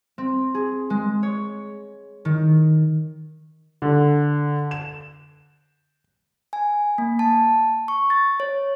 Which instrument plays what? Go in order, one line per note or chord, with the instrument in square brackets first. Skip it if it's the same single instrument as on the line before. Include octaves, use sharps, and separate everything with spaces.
[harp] C4
G#4
G#3
C#5
D#3
[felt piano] D3
E7
[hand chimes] G#5
A#3
A5
C#6
A6
C#5